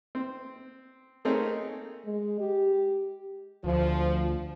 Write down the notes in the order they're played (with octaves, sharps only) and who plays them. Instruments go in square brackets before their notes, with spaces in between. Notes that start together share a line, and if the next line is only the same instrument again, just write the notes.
[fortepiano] C4
A3 A#3 C4 D#4 G#4 C#5
[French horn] G#3
G4
[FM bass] D2 [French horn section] F3